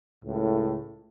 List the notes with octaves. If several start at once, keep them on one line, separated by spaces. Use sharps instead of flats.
C#2 A2